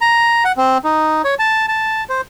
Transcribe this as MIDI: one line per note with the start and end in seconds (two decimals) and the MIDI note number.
0.01 0.44 82
0.45 0.52 78
0.57 0.78 60
0.84 1.22 63
1.25 1.35 73
1.39 1.66 81
1.68 2.04 81
2.09 2.21 72